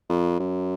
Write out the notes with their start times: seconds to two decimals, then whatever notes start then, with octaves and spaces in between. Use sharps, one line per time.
0.10 F2
0.40 F#2